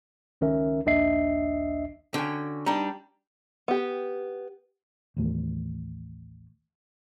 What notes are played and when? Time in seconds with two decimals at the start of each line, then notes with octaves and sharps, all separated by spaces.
0.41 C#2 D#3 C#4 A#4 E5
0.86 A#1 D#2 D4 D#5 E5 C7
2.14 D3 C#4 F#4 G5
2.66 G3 D4 D#4
3.68 B3 G4
5.17 A1 D#2 A3